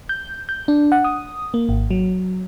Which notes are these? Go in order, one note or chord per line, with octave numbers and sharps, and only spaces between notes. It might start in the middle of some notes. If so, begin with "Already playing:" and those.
G6
G6
D4
F#5
D#6
A#3
G#1
F#3